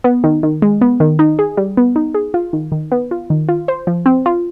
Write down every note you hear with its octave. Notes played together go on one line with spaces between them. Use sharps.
B3
D#3
D#3
G#3
B3
D#3
D#4
G#4
G3
B3
D#4
G#4
F4
D#3
D#3
B3
F4
D#3
F4
C5
F3
C4
F4